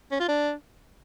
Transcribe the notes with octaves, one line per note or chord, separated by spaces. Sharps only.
C#4
F4
D4